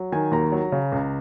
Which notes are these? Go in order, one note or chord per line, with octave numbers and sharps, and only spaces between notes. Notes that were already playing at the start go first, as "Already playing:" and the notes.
Already playing: F#3
D#3 G#5
D#2 A#5
F#3
C#3
C#2